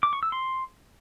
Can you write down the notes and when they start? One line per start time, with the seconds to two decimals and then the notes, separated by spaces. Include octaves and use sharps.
0.03 D6
0.13 C#6
0.23 E6
0.32 C6